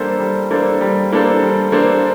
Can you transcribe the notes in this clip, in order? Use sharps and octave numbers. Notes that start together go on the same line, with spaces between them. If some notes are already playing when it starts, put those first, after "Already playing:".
Already playing: G3 A#3 D4 A4 C5
G3
A#3 D4 A4 C5
G3
A#3 D4 A4 C5
G3
A#3 D4 A4 C5